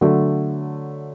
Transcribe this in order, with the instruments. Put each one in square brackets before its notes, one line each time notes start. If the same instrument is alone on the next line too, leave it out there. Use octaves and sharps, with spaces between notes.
[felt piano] D3 F#3 A3